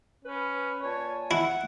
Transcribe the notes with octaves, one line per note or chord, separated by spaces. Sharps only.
C#4 B4
A#2 C#5 G#5 A5
E4 F#5